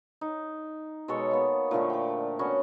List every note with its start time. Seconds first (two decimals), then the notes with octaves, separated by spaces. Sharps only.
0.21 D#4
1.08 B2 G#3 A4 C#5
1.31 A#3 B3
1.71 A#2 D3 F3 A3
1.90 G5 D6
2.39 B3 C#4 F#4